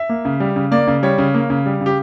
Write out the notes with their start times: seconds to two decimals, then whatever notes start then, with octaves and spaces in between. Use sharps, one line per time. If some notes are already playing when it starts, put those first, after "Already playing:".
Already playing: E5
0.09 A#3
0.25 C#3
0.40 G3
0.56 C#3
0.71 A#3 D5
0.88 C#3
1.03 G3 C#5
1.18 C#3
1.34 A#3
1.50 C#3
1.66 G3
1.81 C#3
1.86 G4